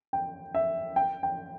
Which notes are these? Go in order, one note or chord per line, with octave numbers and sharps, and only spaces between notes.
G5
E5
G5
G5